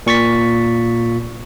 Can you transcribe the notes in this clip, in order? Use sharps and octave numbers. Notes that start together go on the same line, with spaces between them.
A#2 C#6 A6 B6